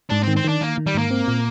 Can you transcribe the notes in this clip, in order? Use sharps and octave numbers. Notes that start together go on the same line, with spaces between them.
G#2 D4
C4
D#3
C4
D#3 D4
D#3 A#3
D#3
G3
G#2 A#3
C4
A#2